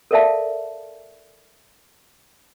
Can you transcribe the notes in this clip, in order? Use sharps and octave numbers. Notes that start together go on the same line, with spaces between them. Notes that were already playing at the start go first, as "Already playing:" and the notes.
A4 A#4 D5 E5 F5 A5